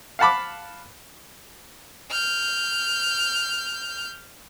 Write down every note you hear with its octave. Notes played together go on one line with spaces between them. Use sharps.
F5 F#5 A5 B5 D6
F6 G6